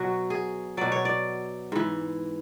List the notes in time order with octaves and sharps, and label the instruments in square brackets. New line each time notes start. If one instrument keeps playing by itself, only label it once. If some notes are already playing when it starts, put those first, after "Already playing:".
Already playing: [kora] B2 F#3 F#4
G#4
B2 F#3 D5
C#5
D5
G#2 E3